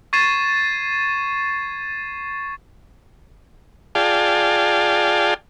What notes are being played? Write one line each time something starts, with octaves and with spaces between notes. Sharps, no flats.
C#6 G#6 A6 C7 D#7 E7
F4 G#4 D5 F5 G5 A5